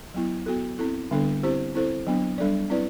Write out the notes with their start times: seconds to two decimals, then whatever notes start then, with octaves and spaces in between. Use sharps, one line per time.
0.14 F#3 B3 E4
0.46 B3 F#4 A4
0.79 C4 E4 A4
1.11 D3 G3 B3 D4 A4
1.43 C4 E4 G4 C5
1.75 C4 E4 A4 C5
2.07 F#3 B3 D4
2.38 G3 D4 A4 D5
2.70 C4 E4 B4 D5